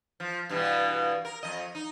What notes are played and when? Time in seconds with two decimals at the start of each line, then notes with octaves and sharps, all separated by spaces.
0.20 F3
0.49 G2 B2 E3
1.25 A#4
1.43 F2 D#5
1.75 D#4